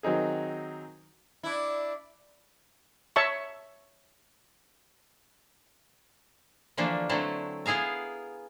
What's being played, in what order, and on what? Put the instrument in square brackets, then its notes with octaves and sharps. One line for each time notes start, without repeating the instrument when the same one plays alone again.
[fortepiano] D#3 F#3 C4 D#4 G#4
[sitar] D4 E4
[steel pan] C#5 E5 A5 C#6
[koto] D3 E3 F3 A3 A#3 D4
D3 F#3 A3 C4 E4
B3 E4 G#4 F5 A#5